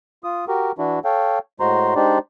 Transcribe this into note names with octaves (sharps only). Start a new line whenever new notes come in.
F4 D#6
F#4 G4 A#4
E3 D4 E4 F#4
A4 C#5 F5 G5
A2 G#3 F#4 C5 A#5 C6
G#3 D4 D#4 G4 C5 D5